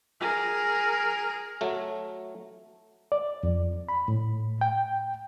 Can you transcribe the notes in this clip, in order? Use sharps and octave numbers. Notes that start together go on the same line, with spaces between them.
G#4 A#4
F#3 A3
D5
F2
B5
A2
G5